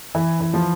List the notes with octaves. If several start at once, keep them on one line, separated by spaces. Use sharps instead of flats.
E3 E4
E3
F3 F4